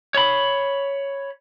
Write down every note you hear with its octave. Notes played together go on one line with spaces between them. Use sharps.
C#5 B5